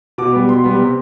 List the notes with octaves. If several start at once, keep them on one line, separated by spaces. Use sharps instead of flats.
B2 D6
G3 B3
B2 C6
G3 B3
C3